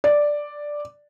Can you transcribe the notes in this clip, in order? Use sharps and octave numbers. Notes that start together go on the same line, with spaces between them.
D5